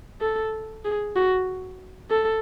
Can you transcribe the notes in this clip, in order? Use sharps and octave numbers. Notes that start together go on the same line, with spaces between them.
A4
G#4
F#4
A4